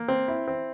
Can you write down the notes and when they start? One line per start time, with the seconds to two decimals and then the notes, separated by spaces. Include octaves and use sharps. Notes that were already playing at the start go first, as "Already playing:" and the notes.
Already playing: A#3
0.08 C4
0.28 E4
0.47 C4